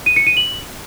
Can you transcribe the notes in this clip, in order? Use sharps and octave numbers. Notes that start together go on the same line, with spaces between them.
D#7
C#7
D#7
F#7